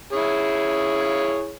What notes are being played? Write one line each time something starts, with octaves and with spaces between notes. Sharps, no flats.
E4 G#4 C#5